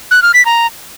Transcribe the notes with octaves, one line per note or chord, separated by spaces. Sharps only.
F#6
F6
B6
A#5